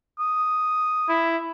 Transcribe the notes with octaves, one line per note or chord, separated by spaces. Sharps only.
D#6
E4